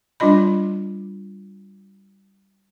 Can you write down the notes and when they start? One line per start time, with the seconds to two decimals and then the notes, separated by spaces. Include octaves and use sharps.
0.20 G3 D4 F4 D#5 B5